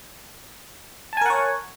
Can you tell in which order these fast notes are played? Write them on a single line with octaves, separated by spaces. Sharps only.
A5 G#5 A#4 F#5 C#5